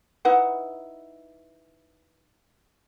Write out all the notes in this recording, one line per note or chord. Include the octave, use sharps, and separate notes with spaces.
D#4 E4 B4 F#5